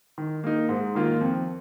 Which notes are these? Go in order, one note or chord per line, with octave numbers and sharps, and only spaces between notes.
D#3
A#3 D#4
G#2
D#3 A#3 F4
F2